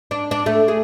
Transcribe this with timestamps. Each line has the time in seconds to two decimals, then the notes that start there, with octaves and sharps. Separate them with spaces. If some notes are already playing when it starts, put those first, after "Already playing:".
0.11 D4
0.31 D4
0.46 A3
0.68 G#4